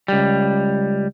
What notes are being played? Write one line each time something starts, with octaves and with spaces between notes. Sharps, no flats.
C#2 G3